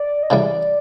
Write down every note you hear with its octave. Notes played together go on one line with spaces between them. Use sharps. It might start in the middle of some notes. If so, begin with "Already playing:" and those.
Already playing: D5
D#5
C#3 E3 G3 D5